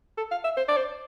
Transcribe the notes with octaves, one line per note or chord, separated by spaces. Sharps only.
A4
F5
E5
C5
D5
C5